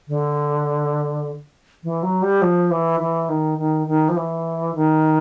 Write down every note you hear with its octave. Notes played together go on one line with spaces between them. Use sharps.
D3
E3
F#3
G3
F3
E3
E3
D#3
D#3
D#3
F3
E3
D#3